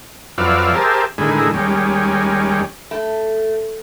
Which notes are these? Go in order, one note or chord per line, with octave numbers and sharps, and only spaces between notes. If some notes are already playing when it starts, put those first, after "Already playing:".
F2 F#3 B4 D5 E5 F5
G4 G#4 A#4 C5 E5 A5
A2 D3 D#3 G#3 E4 G#4
D#2 G3 G#3 C#4
A3